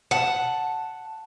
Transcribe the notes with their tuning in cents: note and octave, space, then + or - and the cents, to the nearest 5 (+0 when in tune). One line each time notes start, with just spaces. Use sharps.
F#5 +0 A5 +0